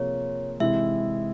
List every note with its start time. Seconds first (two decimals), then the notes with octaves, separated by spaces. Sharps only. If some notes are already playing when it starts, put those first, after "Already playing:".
Already playing: C3 F3 A#3 F4 G#4 C#5
0.60 C3 E3 G#3 E4 E5